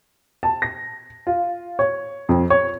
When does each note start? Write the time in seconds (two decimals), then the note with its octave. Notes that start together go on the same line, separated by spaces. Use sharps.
0.43 A5
0.62 A#6
1.27 F4
1.79 C#5
2.29 F2
2.50 C#5